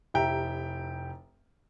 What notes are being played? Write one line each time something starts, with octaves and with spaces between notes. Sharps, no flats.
F1 E4 G4 E5 G5 A#5